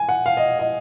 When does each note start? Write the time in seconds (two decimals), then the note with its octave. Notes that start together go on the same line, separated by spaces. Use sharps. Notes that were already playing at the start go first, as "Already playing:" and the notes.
Already playing: G#5
0.09 F#5
0.26 F5
0.37 D#5
0.59 D#5